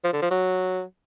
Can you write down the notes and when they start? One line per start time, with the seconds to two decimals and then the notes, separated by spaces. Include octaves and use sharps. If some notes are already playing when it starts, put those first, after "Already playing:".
0.04 F3
0.13 D3
0.22 F3
0.30 F#3